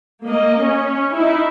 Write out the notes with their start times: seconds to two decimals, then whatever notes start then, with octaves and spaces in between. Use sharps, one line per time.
0.25 A#3 D#5
0.62 C#4
1.15 D#4 E4